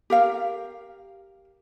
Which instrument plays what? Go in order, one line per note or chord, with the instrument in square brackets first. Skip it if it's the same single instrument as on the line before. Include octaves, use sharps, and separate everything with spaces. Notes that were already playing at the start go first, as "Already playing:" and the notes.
[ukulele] G4 A#4 F5